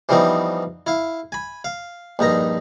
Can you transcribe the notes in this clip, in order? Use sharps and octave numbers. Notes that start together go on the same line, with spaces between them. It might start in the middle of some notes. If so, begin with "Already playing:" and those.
E3 F3 G3 B3 C4 D#4
E4 F5
G#5 B5
F5
A#1 G2 D#4 A#5